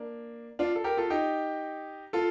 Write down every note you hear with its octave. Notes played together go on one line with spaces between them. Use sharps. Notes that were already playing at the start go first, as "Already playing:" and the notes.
Already playing: A#3 D4
D4 F4
A4
G4 A#4
F4 A4
D#4 G4
F4 A4